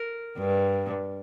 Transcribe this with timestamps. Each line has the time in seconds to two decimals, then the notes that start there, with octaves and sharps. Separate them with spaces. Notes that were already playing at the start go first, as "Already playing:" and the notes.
Already playing: A#4
0.38 G2